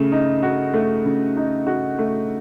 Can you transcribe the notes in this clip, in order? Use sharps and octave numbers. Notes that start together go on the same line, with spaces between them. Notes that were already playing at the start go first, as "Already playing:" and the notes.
Already playing: C#3 A3
D#4
F#4
A3
C#3
D#4
F#4
A3